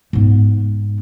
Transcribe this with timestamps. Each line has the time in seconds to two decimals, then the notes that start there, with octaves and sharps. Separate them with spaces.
0.13 G#2 B3